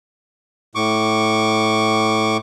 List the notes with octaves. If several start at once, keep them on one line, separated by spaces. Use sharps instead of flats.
A2 C#6 D6